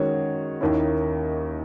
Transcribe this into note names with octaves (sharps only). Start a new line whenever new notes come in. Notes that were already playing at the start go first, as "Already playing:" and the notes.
Already playing: D#3 G#3 C#4 F#4 C#5
D#2 D#3 A#3 C#4 E4